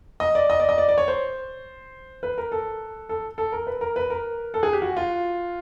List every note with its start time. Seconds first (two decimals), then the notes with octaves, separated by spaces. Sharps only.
0.20 D#5
0.35 D5
0.50 D#5
0.60 D5
0.69 D#5
0.78 D5
0.89 D5
0.98 C#5
1.08 C5
2.23 B4
2.38 A#4
2.52 A4
3.09 A4
3.38 A4
3.52 A#4
3.67 B4
3.81 A#4
3.96 B4
4.10 A#4
4.54 A4
4.63 G#4
4.73 G4
4.82 F#4
4.97 F4